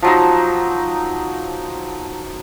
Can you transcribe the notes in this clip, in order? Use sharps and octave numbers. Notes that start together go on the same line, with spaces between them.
F3 F#3 D#4